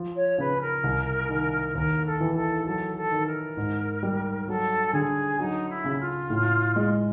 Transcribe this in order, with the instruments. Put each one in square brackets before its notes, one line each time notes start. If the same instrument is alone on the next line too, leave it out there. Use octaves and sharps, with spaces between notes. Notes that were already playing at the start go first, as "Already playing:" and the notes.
Already playing: [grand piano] F3
[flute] C#5
[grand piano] C#3 [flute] B4
[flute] A#4
[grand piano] C2
D#3
[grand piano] D#2 [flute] A#4
[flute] A4
[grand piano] E3
[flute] A4
[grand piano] F#3 [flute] A4
[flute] A4
[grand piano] D#3
[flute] A#4
[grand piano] G#2
G3
[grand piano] F#3 [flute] A4
[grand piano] D3 [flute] G#4
[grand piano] F#3 [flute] D#4
[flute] E4
[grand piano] C#3
[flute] F4
[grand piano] A2
G#3